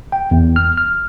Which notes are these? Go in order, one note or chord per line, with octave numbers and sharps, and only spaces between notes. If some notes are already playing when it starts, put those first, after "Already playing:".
G5
E2
F6
F6